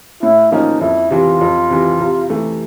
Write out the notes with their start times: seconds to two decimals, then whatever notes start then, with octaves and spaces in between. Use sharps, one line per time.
0.23 A2 E4
0.52 F3 A#3 C#4 D#4
0.81 F2 E4
1.11 C3 E3 F4
1.41 F2
1.70 C3 E3
2.00 C3
2.30 E3 A3